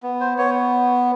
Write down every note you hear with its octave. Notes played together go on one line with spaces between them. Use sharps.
B3
C5
B3 C#5